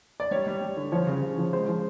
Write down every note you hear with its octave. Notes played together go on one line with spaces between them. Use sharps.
D5
G3 C#5
G3
G3
D3
F3 C#5
C#3
C#3
F3
G#3 C5
F3